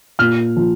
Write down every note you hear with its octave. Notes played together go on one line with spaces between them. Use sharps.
A#2 F6
F3